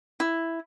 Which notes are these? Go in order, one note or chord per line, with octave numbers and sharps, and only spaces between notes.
E4